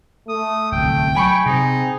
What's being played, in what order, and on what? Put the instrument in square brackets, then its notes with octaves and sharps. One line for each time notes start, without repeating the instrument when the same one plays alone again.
[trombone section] A3 [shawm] D#6
[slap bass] D1 C2 [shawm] G5
[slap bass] F#3 [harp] G#5 B5 C#6
[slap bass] C3 [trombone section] C4 G#4 [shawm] D#4